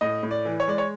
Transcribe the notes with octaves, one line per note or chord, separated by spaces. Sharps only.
A2 D#5
A2
D5
E3
C#5
G#3 D5
C#5